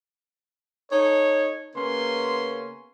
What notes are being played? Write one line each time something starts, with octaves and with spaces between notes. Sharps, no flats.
D#4 A4 C#5
C#3 A#3 B3 C#4 C6